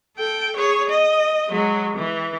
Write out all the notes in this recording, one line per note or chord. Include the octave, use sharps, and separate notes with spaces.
A4 G5
G#4 C#5
D#5
F#3 G#3
E3